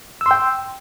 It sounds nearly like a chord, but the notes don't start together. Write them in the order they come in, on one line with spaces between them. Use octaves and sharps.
E6 C6 G5